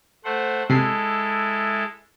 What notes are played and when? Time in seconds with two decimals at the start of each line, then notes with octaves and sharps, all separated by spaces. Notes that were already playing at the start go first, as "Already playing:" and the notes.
0.25 A3 C5 F#5
0.70 C3 G#3 E4 A4 C7